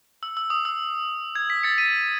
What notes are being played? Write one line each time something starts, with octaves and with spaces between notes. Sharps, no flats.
E6
E6
D#6
E6
G#6
B6
A6 C#7
B6 D#7